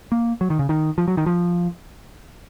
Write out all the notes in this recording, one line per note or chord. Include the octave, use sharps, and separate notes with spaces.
A#3
F#3
D#3
C#3
D#3
F3
F#3
D#3
F3